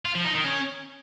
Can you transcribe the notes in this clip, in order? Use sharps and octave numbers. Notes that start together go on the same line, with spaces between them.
F4
F3
D#4
D#3
C#4